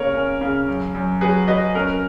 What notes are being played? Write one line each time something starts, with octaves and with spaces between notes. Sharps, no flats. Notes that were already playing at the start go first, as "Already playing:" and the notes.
Already playing: C#3 A#3 A#4 C#5
C#4
C#3
F#2
F#2
F#3 G#4 B4
F#3 B4 D#5
C#4 A#4